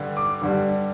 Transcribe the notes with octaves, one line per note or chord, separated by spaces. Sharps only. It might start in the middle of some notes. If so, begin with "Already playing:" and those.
Already playing: G2 D3 G3
D6
G2 D3 G3